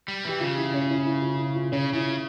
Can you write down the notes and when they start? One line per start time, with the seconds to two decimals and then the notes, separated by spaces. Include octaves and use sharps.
0.08 G3
0.25 E3 G4
0.40 C#3 F4
0.57 E4
0.74 C#4
0.90 E4
1.06 E4
1.22 F4
1.39 E4
1.56 F4
1.72 C#3 C#4
1.94 C#3 E4